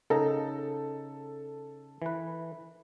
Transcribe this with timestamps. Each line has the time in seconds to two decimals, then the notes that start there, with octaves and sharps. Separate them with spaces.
0.10 C#3 D#4 A4 A#5
2.02 E3 B4